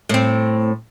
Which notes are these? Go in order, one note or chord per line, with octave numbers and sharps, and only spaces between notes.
A2 C4